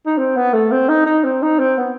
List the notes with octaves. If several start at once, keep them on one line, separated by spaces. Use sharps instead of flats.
D#4
C4
B3
A3
C4
D#4
D#4
C4
D#4
C4
B3